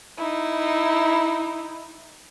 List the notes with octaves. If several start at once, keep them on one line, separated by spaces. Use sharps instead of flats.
D#4 E4